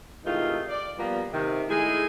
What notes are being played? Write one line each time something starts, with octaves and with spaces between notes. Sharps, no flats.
G#2 C3 D#3 E3 A3 F4
D5
F3 G3 A#3 B3
C3 D#3
G#3 A3 D#4 E4 G#4 G#5